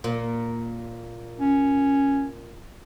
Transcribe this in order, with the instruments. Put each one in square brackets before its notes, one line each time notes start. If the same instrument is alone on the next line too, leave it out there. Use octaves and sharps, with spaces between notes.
[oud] A#2
[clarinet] C#4